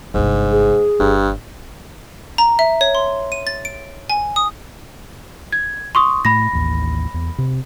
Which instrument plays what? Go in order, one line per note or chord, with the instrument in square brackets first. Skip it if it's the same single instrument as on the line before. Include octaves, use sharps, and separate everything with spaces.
[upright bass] G1 C3 [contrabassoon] G#2
[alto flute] G#4
[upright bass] G1 [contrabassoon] G2
[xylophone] A#5
E5
C#5
C6
D#7
A6
D7
G#5
D#6
[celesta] G#6
C6 C#6 D#6
[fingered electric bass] A2 A3 [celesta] B5 A#6
[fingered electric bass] A1 D#2
E2
C3